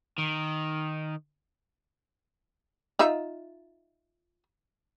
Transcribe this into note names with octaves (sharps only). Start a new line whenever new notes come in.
D#3
D#4 F4 E5